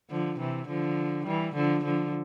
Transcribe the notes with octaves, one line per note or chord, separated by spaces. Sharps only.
D3 F3
C3 E3
D3 F3
E3 G3
D3 F3
D3 F3